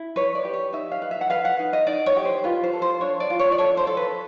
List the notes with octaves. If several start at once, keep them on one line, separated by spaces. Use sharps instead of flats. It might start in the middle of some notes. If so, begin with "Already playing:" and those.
Already playing: E4
B4 C#5
D5
G4
C#5
D#4 E5
F5
B4
E5
F#5
B4 F5
F#5
D#4
D#5
D#4 D5
C#5
G4
C5
F4 B4
C5
A4
C5
D4 C#5
D5
F4
C#5
D5
A4 C#5
C5
A4
B4